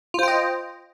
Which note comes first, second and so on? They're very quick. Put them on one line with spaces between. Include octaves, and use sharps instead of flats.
F4 C5 G5 D#5